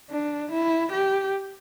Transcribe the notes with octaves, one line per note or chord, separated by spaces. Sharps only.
D4
E4
G4